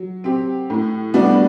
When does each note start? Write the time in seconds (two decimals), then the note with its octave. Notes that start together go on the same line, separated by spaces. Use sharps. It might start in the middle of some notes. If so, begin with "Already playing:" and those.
Already playing: F#3
0.24 C4 G4
0.70 A2
1.14 G3 B3 D4 F#4